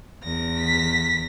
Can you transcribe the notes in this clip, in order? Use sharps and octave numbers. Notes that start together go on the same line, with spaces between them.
E2 A#6
B6